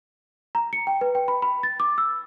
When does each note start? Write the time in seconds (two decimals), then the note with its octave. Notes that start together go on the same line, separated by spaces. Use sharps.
0.55 A#5
0.73 C#7
0.87 G5
1.01 B4
1.15 G5
1.28 B5
1.42 B5
1.63 A6
1.80 D6
1.98 E6